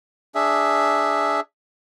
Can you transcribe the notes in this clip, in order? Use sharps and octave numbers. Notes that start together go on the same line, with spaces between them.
D4 G#4 E5